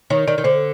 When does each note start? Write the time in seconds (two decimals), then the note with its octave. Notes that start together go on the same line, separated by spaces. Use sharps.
0.10 D#3 C#5
0.28 D#3 D5
0.38 D#3
0.44 D3 C5